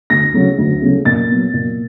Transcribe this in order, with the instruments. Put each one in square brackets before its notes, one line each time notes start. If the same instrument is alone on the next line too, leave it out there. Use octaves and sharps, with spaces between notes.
[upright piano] D2 A#6
C#3 F#3 A3
D2
C#3 F#3 A3
A#2 A6
F#3 B3
A#2